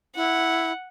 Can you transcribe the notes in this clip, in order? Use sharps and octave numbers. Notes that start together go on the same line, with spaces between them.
E4 F#5